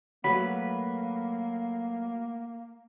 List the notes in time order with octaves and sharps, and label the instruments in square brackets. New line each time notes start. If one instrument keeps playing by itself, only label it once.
[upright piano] F#3 [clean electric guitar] A3 B4 B5 [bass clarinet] A#3 [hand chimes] F#5